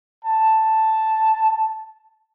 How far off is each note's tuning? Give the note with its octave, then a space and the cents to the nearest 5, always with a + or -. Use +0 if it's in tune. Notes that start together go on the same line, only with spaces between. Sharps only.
A5 +0